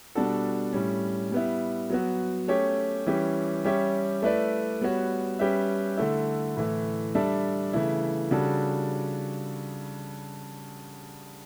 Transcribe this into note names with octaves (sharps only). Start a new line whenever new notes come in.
B2 G3 D4 F#4 A4
A2 G3 C#4
G3 B3 E4
F#3 B3 F#4
A3 C#4 G4 C#5
E3 G3 C#4 G4
G3 C#4 G4 C#5 E5
A3 E4 B4 D5
G3 B3 F#4 C#5
G3 C#4 G4 B4 E5
D3 A3 E4
A2 E3 A3
G3 D4 A4 E5
C#3 E3 A3 E4
C#3 G3 D4 F#4 A4